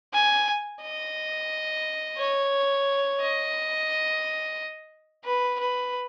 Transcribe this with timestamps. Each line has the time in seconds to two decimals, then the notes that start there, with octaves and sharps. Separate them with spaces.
0.13 G#5
0.82 D#5
2.18 C#5
3.21 D#5
5.25 B4
5.59 B4